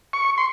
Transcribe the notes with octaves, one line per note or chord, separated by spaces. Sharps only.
C#6
C6